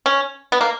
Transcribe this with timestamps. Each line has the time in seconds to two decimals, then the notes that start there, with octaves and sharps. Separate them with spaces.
0.06 C#4
0.52 B3
0.61 A#3